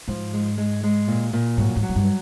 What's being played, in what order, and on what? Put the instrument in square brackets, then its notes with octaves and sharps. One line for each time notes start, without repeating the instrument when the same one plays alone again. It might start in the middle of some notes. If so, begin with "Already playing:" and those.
[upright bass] G#2 [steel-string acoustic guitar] F3
[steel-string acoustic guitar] G#3
G#3
G#3
A#2
A#2
[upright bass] G#2 [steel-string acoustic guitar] F#3
[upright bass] G#2
[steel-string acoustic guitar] F#3
[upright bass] G#2
G2